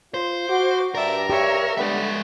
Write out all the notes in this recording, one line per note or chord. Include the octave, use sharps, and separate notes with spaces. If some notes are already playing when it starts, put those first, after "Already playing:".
F4 C5
F#4 D6
G2 A#4 D5 E5
G4 C#5 E5
D3 G3 G#3 B3 E5